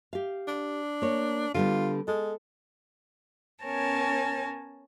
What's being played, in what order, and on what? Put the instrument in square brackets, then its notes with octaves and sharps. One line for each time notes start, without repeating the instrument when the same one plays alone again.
[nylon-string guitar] G4 F5
[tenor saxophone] D4
[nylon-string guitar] A#3 C#5
[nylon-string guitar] D3 G3 B3 [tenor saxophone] F4
[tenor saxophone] G#3 [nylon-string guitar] A4
[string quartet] B3 C#4 A#4 C#5 G#5 A5